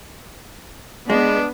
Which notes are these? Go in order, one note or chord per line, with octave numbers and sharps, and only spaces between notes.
G#3 B3 D4